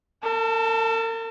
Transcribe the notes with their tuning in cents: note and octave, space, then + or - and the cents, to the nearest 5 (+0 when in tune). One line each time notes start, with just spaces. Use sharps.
A#4 -45 A5 +0